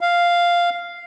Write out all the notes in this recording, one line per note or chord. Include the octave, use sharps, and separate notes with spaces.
F5